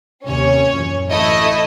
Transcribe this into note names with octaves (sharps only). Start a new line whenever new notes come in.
D#2 C3 C#4 C#5
F#2 A#2 E3
A1 D2 A3 E4 D#5